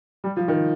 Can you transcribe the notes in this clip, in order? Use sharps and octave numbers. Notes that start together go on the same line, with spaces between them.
G3
F3
D#3